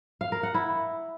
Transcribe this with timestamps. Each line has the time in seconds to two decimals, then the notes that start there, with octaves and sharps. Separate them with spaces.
0.21 F5
0.32 A#4
0.43 F#5
0.54 E4